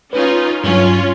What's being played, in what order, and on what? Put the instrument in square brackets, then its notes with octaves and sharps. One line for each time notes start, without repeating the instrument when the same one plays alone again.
[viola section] C#4 D#4 F4 [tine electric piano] B4
[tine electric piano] G2 F#3 [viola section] C#4 F4 C#5